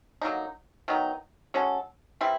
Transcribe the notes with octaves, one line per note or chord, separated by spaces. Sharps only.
D3 F#3 A#3 D#4
D#3 F#3 B3 D#4
G#3 C#4 F#4 A4
E3 G3 C4 E4